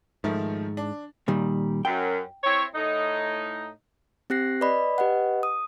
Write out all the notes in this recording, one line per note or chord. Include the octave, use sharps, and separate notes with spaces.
G#2 D#3 F3 A3
D4
A#2 D#3 G3
F#2 G5
C4 E4 C#5
A2 D#4
C4 G4 F#6 A#6 C7
B4 D5 D#5 B5
G4 B4 D#5 F#5
D#6